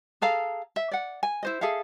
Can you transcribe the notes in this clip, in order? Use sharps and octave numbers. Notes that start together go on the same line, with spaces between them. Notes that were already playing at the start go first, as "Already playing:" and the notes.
G#4 A4 F5 A#5
E5
D5 F#5
G#5
E4 C5 D#5
G#4 A4 E5 F5